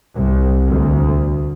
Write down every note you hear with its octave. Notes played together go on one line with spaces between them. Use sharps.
C2
D2